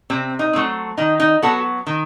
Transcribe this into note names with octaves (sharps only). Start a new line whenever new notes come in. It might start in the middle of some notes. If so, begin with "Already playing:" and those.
C3 C4
D#4
F#3 A3 C4
D#3 D#4
D#4
F#3 B3 F#4 A4
D#3